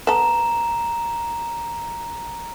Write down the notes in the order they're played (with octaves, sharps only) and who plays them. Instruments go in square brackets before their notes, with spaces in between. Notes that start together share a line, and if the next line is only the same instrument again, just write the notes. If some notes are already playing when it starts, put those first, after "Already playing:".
[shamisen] B3 A4 [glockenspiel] A#5 E7